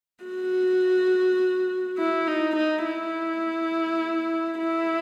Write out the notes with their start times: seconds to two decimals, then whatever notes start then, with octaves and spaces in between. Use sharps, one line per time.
0.25 F#4
1.98 E4
2.28 D#4
2.56 D#4
2.85 E4
4.59 E4